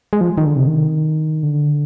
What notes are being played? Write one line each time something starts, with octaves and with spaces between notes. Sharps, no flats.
G#3
F3
D#3
D3
C3
D#3
D3